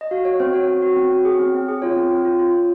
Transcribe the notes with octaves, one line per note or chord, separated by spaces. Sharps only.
D#5
F#4 F5
F#4 C#5
C4 C5
F#4 C#5
C4
F#4
C4
F#4
G#4
C4
C4
G#4
F4 C#5
C4
C4
F4
F4
F4